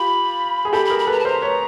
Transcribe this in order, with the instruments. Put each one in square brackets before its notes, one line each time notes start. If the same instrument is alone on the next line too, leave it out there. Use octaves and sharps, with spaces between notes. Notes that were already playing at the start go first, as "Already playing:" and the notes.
Already playing: [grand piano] F4 G4 [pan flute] B5
[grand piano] G#4
[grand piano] G4 A4 [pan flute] B5
[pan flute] B5
[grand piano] G#4 A#4
[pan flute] B5
[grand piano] A4 B4 [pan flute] A#5
[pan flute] A5
[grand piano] A#4 C5 [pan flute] A#5
[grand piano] B4 C#5